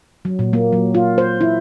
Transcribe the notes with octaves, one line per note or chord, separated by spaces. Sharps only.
F#3
A#2
A#3
F#3
F4
C5
E4